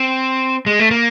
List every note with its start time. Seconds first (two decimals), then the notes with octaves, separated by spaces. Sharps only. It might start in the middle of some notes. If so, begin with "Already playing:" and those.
Already playing: C4
0.66 G#3
0.79 A3
0.91 A#3